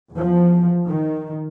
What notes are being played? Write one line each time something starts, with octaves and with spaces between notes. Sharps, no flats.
E2 F3
D#3